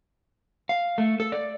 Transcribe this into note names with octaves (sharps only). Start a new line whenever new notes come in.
F5
A3
A4
D5